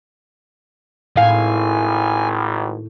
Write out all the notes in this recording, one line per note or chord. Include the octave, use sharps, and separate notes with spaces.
G#1 A2 F5 G#5